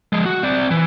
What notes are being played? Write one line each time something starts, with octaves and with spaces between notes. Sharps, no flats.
F3 G#3
F#4
C4 D5
E3